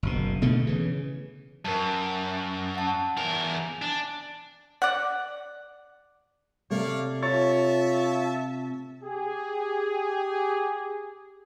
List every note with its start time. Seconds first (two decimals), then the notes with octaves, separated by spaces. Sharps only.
0.03 F#1 B2
0.42 B2 D3 A3
0.67 C#3 E3
1.65 F#2 A#4 A5
2.75 F#5 A5
3.17 E2 A#4 G#5
3.82 D4
4.82 D5 F#5
6.71 C3 A3 C#5 D5 F5
7.23 F4 C#5 E5 A5 C#6 A6
9.03 G4 G#4